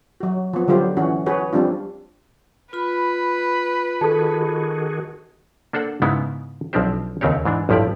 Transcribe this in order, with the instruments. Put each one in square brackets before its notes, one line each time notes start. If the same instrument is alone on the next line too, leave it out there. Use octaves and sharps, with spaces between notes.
[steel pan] F#3 F#4
F3 B3
D3 F#3 G3 F4 G4 C5
E3 C#4 F#4
F#4 G#4 B4 C#5
F3 G3 C4 D4 F4
[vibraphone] F4 B5 [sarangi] B4
[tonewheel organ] D#3 F#4 G#4 [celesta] A4 A5
[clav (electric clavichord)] A#3 D4 A4 C5 F#5
G#2 C#3 G#3 B3 D#4 E4
B1 F3 C4 D4 G4 C5
D#2 C#3 C4 G4 C#5
G#2 E3 D4
A1 G2 F3 E4 G4 D5